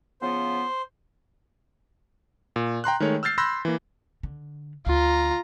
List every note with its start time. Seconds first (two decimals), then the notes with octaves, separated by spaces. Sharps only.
0.22 C#3 F3 B3 C5
2.56 A#2
2.84 G5 A#5 C6 F#6
3.00 D#3 G#3 A3 C#5
3.23 E6 F6 G6 A6 C7
3.38 B5 C6 E6 F#6 G6 A#6
3.65 E3 A#3
4.23 D3
4.86 D2 F4 A#5